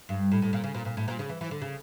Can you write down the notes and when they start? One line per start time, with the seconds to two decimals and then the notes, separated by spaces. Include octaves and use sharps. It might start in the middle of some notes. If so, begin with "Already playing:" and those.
0.09 G2
0.32 A2
0.42 A2
0.53 A#2
0.64 C#3
0.74 A#2
0.85 A#2
0.97 A2
1.08 A#2
1.19 C#3
1.29 E3
1.41 E3
1.51 D3
1.62 C#3